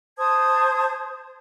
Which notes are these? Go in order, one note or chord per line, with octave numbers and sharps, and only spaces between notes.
C5 A5 D#6 G#6